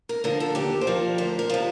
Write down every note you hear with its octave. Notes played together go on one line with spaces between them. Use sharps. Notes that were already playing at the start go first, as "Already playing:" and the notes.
A#4
D3 F3 A#4
A4
D#2 G4
C5
D3 F3 A#4
D2 C5
A#4
C3 F3